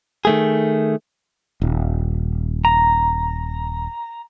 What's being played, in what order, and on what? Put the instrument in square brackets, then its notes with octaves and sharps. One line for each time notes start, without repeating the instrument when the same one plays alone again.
[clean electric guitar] D#3 A3 G#4
[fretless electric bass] D#1
[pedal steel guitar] A#5